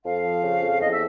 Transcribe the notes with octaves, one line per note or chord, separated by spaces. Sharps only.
F2 F5
F3
C#3
F2
E2 D#5
E5